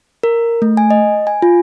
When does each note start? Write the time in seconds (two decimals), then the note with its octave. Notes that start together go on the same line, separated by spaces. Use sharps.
0.23 A#4
0.62 A3
0.77 G#5
0.90 D#5
1.27 G#5
1.42 F4